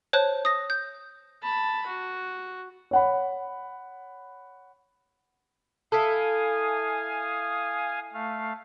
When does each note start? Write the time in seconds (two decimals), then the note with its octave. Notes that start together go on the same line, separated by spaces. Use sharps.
0.13 C5 C#5 A5 F#6
0.45 D#6 A#6
0.70 G6
1.43 A5 B5
1.87 F#4
2.91 C#5 F#5 B5
5.92 E4 A4 F5 G#5 D#6
8.13 A3 F5